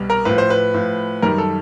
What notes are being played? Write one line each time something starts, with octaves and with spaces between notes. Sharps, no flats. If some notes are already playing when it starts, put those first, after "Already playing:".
Already playing: C2 B2 G3
A#4
A2 F3 B4
C5
B4
A2 F3
F#2 D#3 G3 A#4
A4